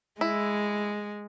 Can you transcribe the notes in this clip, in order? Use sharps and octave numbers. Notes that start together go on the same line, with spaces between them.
G#3 E4